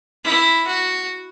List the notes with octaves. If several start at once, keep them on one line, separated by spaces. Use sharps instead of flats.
E4
F#4